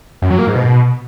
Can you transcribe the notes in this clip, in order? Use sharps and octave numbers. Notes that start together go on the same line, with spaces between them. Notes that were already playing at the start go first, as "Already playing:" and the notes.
F#2
F#3
A#3
G#2
B2